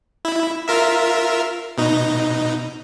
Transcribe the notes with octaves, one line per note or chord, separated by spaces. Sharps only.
E4
F4 A#4 E5
B2 D#4